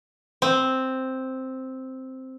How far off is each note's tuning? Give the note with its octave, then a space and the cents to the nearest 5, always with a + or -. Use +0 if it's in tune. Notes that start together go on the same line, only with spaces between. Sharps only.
C4 +0